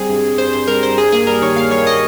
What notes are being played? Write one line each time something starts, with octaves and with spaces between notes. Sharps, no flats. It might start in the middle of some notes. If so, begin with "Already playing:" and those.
Already playing: G3 C4 G#4
G2
G2
G2 C5
G2 C5
G3 A#4
G2 C5
G2 G#4
A#3 G#4
G3 A#4
D#3 C#5
A#3 F5
G3 C#5
D#5